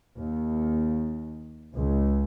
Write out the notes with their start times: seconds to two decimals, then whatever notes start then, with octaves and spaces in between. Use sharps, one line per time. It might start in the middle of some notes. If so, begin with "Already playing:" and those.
0.17 D#2
1.74 C#2